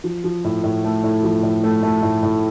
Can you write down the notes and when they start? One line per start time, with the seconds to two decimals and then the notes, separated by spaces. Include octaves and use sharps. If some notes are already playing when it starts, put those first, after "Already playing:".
0.04 F3
0.24 F3
0.44 A2
0.64 A2
0.84 A3
1.04 A2
1.23 F3
1.43 A2
1.64 A3
1.83 A3
2.02 A2
2.23 A2